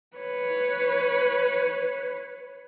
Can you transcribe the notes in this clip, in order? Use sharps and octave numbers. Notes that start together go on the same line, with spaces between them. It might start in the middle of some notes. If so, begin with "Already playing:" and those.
B4 C#5